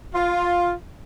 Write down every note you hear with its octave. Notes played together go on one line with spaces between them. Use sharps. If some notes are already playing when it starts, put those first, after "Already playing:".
F4